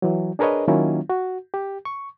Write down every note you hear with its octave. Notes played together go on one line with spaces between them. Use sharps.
E3 F#3
D4 G#4 A#4 B4 C#5 D#5
D#3 F#3 A#3 C#4 E4 F4
F#4
G4
C#6